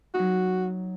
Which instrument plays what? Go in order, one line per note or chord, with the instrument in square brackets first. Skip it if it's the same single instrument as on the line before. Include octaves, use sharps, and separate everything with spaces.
[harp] F#3 D#4 [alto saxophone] F#4